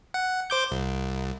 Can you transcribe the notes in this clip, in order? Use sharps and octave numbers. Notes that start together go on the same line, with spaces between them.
F#5
C5 D6 G6
C2